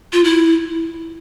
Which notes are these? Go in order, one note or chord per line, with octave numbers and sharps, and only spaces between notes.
F4
E4